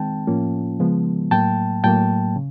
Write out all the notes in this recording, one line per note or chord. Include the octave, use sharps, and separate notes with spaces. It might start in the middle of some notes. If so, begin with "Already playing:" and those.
Already playing: D#3 G#3 C4 G5 A5
A2 F3 A#3 C#4 F4
C#3 F3 G#3 B3
A2 F#3 A#3 G5 A5
A2 F#3 A#3 G5 A5
C#3